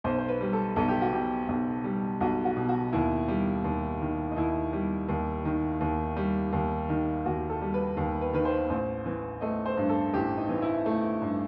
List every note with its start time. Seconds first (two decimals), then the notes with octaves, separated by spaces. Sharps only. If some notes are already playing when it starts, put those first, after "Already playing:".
0.04 B1 C5
0.18 C5
0.29 B4
0.41 G3
0.53 A4
0.76 B1 A4
0.88 G4
1.02 F#4
1.13 B2 G4
1.49 B1
1.84 G3
2.20 B1 F#4
2.45 F#4
2.57 B2
2.69 F#4
2.93 D#2 E4
3.28 G3
3.64 D#2
4.02 D#3
4.32 D#4
4.36 D#2 E4
4.73 G3
5.09 D#2
5.45 D#3
5.81 D#2
6.17 G3
6.53 D#2
6.89 D#3
7.25 D#2 F#4
7.50 A4
7.62 G3
7.74 B4
7.97 D#2
8.21 B4
8.33 D#3 B4
8.45 C5
8.70 A1 C5
9.06 E3
9.41 A3 D#5
9.66 C5
9.77 G2
9.89 A4
10.14 A1 G4
10.37 D#4
10.49 E3
10.62 E4
10.86 A3
11.22 G2